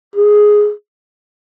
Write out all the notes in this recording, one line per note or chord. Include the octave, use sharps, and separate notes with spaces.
G#4